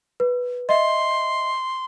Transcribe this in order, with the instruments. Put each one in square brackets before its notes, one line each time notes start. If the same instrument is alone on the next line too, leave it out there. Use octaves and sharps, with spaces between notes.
[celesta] B4
[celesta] D#5 E5 [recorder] C6